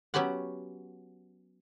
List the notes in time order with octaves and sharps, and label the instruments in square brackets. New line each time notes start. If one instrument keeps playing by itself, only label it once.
[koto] F#3 B3 C#4 G4 F#5